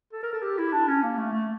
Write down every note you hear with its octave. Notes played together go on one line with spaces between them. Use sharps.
A4
A#4
A4
G4
E4
D4
C#4
A#3
A3
A3